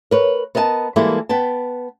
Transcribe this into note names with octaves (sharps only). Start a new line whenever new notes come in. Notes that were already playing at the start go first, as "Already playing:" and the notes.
A#4 B4 C#5
B3 A#4 D#5 F#5 A5
E3 G3 G#3 A#3 E4 A4
B3 B4 G5 A5